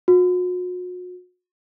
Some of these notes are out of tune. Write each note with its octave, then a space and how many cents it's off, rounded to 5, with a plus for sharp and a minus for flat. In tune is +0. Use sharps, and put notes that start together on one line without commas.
F#4 -40